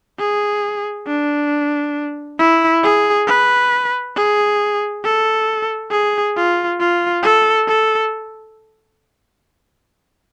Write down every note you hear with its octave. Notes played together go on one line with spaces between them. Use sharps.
G#4
D4
E4
G#4
B4
G#4
A4
G#4
F4
F4
A4
A4